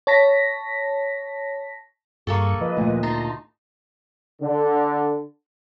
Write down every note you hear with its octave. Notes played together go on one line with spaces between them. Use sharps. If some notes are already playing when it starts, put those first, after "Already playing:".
C#5 A5 A#6 B6
G2 A#3 G#4 A4 C#6
F3 B4 D#5
D2 A#2
D#4 A5 A#5 C6
D3